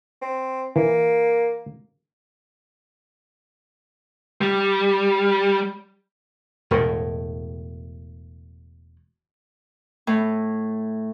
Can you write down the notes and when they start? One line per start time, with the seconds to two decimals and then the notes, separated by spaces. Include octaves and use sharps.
0.22 C4
0.76 E3 A#3
4.41 G3
6.71 E1 A2
10.07 A2